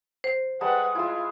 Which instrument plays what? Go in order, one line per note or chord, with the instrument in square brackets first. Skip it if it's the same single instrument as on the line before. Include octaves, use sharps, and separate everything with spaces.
[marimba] C5
[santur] G3 G#3 A5 [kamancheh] B4 F#5
[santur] G#3 E4 [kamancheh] F4